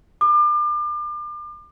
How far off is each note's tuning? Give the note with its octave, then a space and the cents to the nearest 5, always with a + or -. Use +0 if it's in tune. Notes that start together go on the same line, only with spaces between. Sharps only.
D6 +35